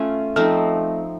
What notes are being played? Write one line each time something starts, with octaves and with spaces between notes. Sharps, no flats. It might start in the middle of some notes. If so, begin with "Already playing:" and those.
Already playing: A3 C#4 F4
F3 A3 C4 D#4 A4